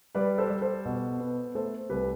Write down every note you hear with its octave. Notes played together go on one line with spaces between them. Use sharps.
G3 B4 D5
A4 C5
G3
A4 C5
B2
B3
A3 A4 C5
C2 G4 B4